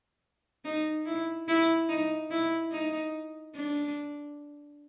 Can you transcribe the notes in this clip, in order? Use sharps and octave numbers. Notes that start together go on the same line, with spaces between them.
D#4
E4
E4
D#4
E4
D#4
D4